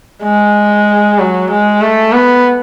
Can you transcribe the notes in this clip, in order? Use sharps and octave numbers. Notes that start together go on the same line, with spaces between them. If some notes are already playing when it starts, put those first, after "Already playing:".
G#3
F#3
G#3
A3
B3